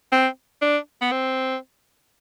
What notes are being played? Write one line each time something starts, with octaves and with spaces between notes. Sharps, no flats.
C4
D4
B3
C4